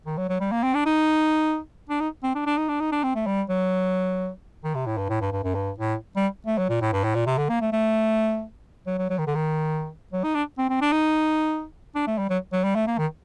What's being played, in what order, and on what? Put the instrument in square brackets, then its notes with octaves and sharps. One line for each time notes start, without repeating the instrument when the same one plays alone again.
[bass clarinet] D#3
F#3
F#3
G3
A#3
C4
D4
D#4
D4
D#4
C4
D4
D4
D#4
D4
D#4
D4
C4
A3
G3
F#3
D#3
C3
A2
G2
A2
G2
G2
F#2
G2
A2
G3
A3
F#3
A#2
A2
G2
A2
A#2
C3
D3
A#3
A3
A3
F#3
F#3
F#3
D#3
D3
D#3
F#3
D#4
D4
C4
C4
D4
D#4
D4
A3
G3
F#3
F#3
G3
A3
A#3
D#3